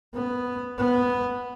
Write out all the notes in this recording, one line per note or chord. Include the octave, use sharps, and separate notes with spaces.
B3
B3